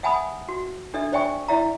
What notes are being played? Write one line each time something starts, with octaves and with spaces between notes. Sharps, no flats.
E5 F#5 G#5 A5 B5 D#6
F#4
D4 A4 D#5 E5
C5 D5 E5 G5 G#5 C#6
E4 D5 E5 F5 A#5